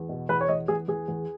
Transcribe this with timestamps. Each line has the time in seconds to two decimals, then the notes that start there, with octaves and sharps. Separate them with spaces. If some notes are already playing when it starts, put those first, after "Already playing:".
Already playing: E2
0.09 B2
0.29 E2 B4
0.41 C#5
0.49 E2 D#5
0.68 E2 G#4
0.88 E2 G#4
1.08 E2